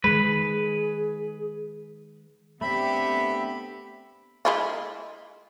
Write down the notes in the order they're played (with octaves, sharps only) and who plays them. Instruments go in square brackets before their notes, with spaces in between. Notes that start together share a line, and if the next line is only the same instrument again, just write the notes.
[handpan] D#3 G#3 [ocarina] G#4 [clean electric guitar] B4
[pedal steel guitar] A3 C4 D4 [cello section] B3 G4 [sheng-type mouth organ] E5 [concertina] B5
[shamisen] G#3 E4 F4